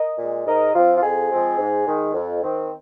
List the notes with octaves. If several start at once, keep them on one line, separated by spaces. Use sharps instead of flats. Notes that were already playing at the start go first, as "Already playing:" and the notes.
Already playing: A#4 D#5
A#2 G#3
G#2 A#4 D#5
F3 C4 F4
F4
F2 G#4
F3 G#3 C4
G#2
D#3 G#3
F2
D#3 C4